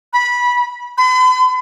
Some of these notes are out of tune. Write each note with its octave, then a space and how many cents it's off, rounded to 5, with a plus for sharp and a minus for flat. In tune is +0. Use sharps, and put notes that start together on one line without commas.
B5 -15
B5 +45